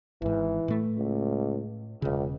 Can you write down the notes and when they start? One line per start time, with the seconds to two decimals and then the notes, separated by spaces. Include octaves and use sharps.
0.22 G#1 G#2 E3
0.68 A2 A3
0.97 C#2
2.02 E1 C#2 C#3